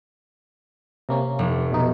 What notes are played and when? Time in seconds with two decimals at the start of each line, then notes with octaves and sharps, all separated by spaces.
1.09 C3 A#3 C#4
1.39 F1
1.72 B2 D#4